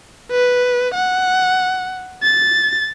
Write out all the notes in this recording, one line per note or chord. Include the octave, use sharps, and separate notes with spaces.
B4
F#5
A6